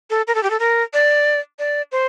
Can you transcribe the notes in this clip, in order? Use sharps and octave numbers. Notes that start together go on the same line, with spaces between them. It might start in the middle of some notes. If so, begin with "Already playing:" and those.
A4
A#4
A4
G4
A4
A#4
D5
D5
C5